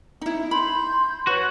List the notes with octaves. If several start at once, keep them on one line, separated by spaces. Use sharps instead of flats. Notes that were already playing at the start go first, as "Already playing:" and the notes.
D#4 E4
B5 C6 G6
F#4 B4 C#5